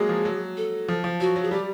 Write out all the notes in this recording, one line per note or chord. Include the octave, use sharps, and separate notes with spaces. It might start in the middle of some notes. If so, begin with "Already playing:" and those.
Already playing: F#3 G#3 A#3 G#4
F3
F#3
A4
F3
F3
F#3 F#4
F#3
G#4
G3 G4